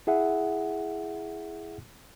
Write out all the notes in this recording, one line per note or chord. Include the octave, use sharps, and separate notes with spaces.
E4 G#4 E5 F#5